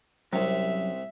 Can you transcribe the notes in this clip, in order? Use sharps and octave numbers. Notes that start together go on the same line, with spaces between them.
C2 F#2 C3 E5